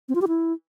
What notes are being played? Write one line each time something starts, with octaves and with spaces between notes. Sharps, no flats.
C4
F4
G4
E4